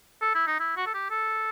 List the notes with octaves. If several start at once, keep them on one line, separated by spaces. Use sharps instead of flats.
A4
E4
D#4
E4
F#4
A4
G4
A4